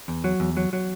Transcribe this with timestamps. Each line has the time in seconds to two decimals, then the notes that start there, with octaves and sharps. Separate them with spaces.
0.08 E2
0.24 F#3
0.40 E2
0.57 F#3
0.73 F#3